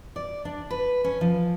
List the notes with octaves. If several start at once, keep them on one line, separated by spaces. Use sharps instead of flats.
D5
D4
B4
C#4
F3